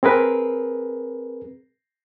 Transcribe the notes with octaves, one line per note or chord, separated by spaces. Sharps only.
C4 G#4 A#4 B4